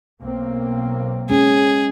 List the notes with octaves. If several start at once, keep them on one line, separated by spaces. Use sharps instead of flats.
B1 A#3 C4
G#3 C#4 G#4